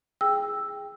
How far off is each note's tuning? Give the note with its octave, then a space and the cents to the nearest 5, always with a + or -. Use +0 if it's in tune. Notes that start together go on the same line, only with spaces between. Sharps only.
G#4 +0 G5 +15 E6 +0